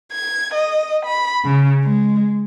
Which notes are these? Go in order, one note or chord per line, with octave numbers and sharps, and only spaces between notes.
G#6
D#5
B5
C#3
G#3